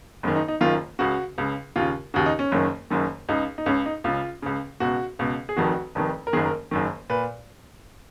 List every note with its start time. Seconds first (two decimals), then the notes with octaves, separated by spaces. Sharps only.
0.23 F#1 F#2 D#3
0.36 D#4
0.48 D#4
0.61 F#1 F#2 D#3 F4
0.99 C#2 C#3 F#4
1.38 C#2 C#3
1.76 D#2 C#3 F4
2.14 D#2 C#3 F#4
2.26 D#4
2.39 C#4
2.52 F#1 F#2 D#3
2.90 F#1 F#2 D#3
3.29 C#2 C#3 D#4
3.58 D#4
3.66 C#2 C#3 C#4
3.86 D#4
4.04 C#2 C#3 F4
4.42 C#2 C#3
4.80 C#2 B2 F#4
5.19 C#2 B2
5.49 G#4
5.57 F1 F2 D#3 F#4
5.95 F1 F2 D#3
6.27 A#4
6.33 F#1 F#2 D#3 G#4
6.46 A#4
6.71 F#1 F#2 D#3
7.10 A#2 B4